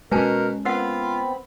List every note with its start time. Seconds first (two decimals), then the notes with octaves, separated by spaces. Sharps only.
0.11 B2 G#3 C#4 A#4 B4 G#5 A5
0.65 B3 C4 F4 A#4 C5 F#5 B5